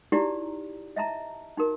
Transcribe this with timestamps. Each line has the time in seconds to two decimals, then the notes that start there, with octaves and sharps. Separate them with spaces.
0.12 D#4 E4 F#4 G4 D5 A#5
0.96 D#5 E5 A5 A#5
1.57 D#4 F#4 A#4